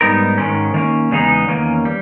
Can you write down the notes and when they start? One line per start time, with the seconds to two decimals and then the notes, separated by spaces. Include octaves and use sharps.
0.01 G#2 G3 B3 D#4 A#4
0.38 G#2 D#3 G#3 C#4
0.74 D#3 A#3 C#4
1.11 E2 C#3 G#3 B3 D#4
1.49 E2 D#3 A#3 C#4
1.85 G3